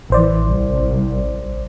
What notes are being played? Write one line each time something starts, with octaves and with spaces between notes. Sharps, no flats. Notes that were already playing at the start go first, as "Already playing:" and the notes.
A1 E3 C5 D5
C2